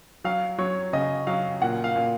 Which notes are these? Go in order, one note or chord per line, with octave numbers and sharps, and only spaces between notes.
F#3 F5
F#3 C#5
C#3 D#5
F#3 F5
A#2 F#5
F5
A#2